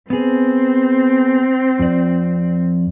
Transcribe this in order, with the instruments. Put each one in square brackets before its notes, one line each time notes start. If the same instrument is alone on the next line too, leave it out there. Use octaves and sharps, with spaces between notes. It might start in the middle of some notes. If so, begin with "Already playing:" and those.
[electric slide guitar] B3 G#4 [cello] C4
[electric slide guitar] F2 D5